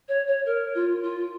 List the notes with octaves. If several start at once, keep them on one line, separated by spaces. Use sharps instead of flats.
C#5
C#5
A#4
F4
F4